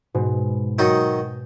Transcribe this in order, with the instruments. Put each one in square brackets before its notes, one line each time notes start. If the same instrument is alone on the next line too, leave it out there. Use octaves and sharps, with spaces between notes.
[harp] G#2 B2
[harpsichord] D#3 F#3 D#4 [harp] G6 A6 C#7